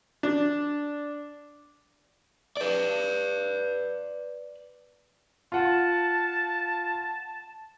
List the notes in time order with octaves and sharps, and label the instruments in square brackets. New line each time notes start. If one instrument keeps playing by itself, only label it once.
[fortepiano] D4
[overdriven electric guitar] B4 D5
[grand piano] F4 F#5 [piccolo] A5